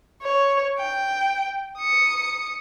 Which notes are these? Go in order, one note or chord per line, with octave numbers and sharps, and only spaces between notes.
C#5
G5
D#6 C#7